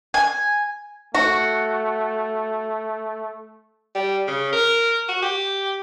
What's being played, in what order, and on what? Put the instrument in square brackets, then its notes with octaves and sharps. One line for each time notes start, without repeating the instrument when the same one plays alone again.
[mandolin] G#5
[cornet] A3 [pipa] F#4
[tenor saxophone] G3
C#3
A#4
F#4
G4